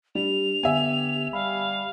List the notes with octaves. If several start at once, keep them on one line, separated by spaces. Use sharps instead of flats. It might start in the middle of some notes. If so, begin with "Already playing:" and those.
G3 D4 F7
D3 B3 G4 E5 G#5
G3 F5 B5